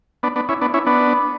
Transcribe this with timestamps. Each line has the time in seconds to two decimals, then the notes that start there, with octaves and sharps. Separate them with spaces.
0.23 B3 D4
0.36 B3 D4
0.49 C#4 E4
0.61 B3 D4
0.74 C#4 E4
0.86 B3 D4